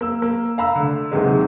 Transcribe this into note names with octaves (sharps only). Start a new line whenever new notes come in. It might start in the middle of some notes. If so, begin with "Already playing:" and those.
A#3 E6
A#3
F5 A#5 B5 E6
D3 A3
D#2 G#2 C3 D#3 F#3 G#3